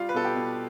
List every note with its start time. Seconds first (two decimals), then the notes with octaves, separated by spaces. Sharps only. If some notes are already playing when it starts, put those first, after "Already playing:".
Already playing: G3 F4
0.09 B4
0.14 B2 A4
0.24 G4
0.35 B2